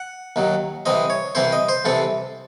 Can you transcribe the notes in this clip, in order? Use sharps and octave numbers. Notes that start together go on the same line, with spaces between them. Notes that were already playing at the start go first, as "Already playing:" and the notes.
Already playing: F#5
D#2 D#3 F#3
C2 C3 E3 C4 D#5
C#5
C2 C3 E3 C4 C5
D#5
C5
C2 C3 E3 C4 A4